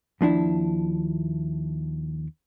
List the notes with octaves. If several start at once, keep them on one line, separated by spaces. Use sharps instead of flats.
D#2 F3 D4 E4